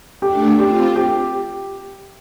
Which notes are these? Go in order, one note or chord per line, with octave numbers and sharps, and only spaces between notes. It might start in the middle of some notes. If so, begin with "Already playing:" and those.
A3 D4 G4
C4 F4 G4
G4